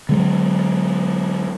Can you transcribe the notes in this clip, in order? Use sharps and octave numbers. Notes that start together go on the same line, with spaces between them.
D3 F#3 G#3